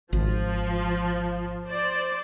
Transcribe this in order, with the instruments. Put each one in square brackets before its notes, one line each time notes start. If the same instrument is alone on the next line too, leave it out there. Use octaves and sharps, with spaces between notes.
[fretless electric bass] G#1 [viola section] F3
[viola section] C5 D5